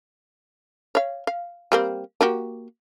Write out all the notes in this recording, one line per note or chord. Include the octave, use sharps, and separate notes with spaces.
C#5 F5
F5
G3 A#3 C4
A#3 F#4 G4